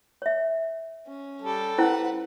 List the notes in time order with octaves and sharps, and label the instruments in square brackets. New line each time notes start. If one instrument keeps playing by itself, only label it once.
[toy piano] C#5 E5
[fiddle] C#4
[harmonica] G3 A4
[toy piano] C#4 E4 C5 [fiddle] B4 F#5